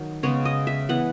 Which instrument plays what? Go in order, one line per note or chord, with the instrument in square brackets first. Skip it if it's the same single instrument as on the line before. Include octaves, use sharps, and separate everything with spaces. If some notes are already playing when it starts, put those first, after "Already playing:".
Already playing: [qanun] D#3 F#3
C#3 G#3 B3 C#5
D#5
E5
E3 B3 F#5